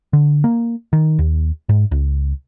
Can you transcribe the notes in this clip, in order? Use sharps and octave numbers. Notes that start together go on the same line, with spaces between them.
D3
A#3
D#3
D#2
G#2
C#2